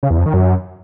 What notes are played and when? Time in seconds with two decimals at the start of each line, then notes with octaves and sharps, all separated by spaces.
0.03 C#3
0.10 E2
0.18 F2
0.26 D#3
0.34 F#2